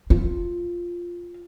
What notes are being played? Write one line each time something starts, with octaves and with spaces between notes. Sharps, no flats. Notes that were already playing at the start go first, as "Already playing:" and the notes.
F4